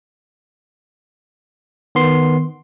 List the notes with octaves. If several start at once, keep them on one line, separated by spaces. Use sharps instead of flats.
D#3 B3 C6 C7